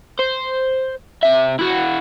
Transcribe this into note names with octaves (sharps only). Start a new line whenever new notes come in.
C5
C3 E5
E4 F#4